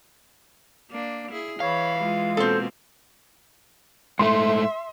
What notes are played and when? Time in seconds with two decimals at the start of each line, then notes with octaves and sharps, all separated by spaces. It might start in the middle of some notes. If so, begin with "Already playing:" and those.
0.90 A#3 D4
1.31 E4 G#4
1.60 E3 C#5 F5 B5
1.99 G#3 F4
2.37 B2 A#3 C4 A4 C5
4.19 G#2 A3 E5 C6